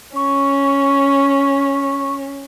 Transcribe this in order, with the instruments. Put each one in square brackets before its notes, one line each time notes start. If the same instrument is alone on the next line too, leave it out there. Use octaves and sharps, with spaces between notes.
[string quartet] C#4 [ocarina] C#6